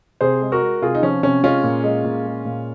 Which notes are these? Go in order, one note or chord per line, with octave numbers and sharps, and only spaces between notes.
C3 G#4 C5
G#3
F#4 A#4
G#3
C3 F4 G#4
D#4
F3 C#4
C3 C#4
G#3 C#4 F4
A#2
G#3
A#2
G#3
A#2